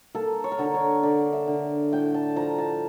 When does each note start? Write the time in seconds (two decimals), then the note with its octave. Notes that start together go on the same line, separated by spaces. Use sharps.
0.15 A#3 A4
0.44 C#5
0.52 A#4
0.59 D3 A4
0.65 A#4
0.74 C#5
1.03 D3 D5
1.33 E5
1.48 D3
1.92 A2 G5
2.14 A5
2.36 F3 A#5
2.58 A5